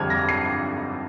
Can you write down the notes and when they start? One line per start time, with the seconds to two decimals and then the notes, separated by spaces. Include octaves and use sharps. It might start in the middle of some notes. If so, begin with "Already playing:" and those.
Already playing: F2 D3 G3 C4 F6 G#6
0.10 A#6
0.29 C7